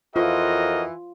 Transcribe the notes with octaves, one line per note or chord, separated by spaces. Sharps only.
F2 E3 F4 F#4 A#4 D#5